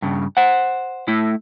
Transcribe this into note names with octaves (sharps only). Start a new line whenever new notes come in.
G2 C#3
C5 F#5
A3 E4